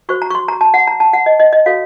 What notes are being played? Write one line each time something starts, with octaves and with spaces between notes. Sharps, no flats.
F#4 C5 C#6
A#5
C#6
C6
A#5
A5
F#5
A#5
A5
F#5
D#5
D#5
D#5
F#4 A4 C#5 F5